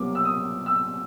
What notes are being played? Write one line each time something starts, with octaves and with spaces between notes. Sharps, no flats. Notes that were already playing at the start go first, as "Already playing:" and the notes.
Already playing: C2 B2 F#3 A#3 D6
E6
D#6
E6